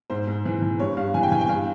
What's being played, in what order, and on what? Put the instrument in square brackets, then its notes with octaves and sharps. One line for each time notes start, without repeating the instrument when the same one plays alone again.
[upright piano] G#2 C5
G#2
E3
E3
G2 C#5
G2 F5
E3 G#5
G5
E3 G#5
G5
G2 F5